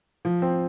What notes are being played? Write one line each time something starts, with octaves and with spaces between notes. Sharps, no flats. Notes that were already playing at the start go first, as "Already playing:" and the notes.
F3
C4